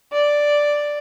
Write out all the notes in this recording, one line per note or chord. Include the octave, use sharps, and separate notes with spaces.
D5